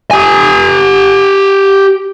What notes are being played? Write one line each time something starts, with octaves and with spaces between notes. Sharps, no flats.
G4 G#5